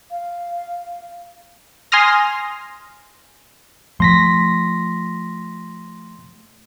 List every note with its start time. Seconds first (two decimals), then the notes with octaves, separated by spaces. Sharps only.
0.11 F5
1.92 G#5 C6 D#6 F6 A#6
4.00 F3 A3 C6 A#6 B6